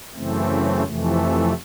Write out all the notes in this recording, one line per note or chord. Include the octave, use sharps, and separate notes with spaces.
F#2 C#3 E3 A3 C4
F2 C3 E3 A3